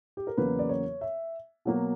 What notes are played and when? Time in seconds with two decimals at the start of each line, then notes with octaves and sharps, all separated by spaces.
0.17 G4
0.27 A#4
0.37 E2 C#3 F#3 A#3 B4
0.59 D5
0.69 C#5
1.01 E5
1.65 B2 F#3 A#3